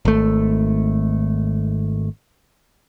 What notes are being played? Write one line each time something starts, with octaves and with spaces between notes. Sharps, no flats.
G#1 A3